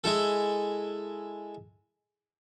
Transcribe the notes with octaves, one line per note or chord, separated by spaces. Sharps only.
G#3 E4 A4